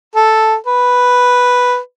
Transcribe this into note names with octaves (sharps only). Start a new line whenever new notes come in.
A4
B4